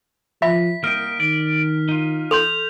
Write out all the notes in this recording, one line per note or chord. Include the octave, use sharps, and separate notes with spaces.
F3 E5 B5 B6
C2 A#3 D#5 G5 F6
D#3 D5
D#4 F4
A4 C6 G6 F7